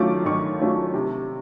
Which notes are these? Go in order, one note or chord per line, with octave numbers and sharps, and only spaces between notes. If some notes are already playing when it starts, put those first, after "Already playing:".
Already playing: D#3 F#3 A3 C#4 F4 C#6 D6
D#3 C#6
F#3 A3 C#4 F4
C3